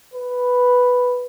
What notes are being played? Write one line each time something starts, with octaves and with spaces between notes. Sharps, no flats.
B4